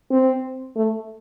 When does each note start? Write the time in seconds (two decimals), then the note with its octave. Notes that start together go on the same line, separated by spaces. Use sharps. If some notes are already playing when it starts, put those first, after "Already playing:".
0.11 C4
0.76 A3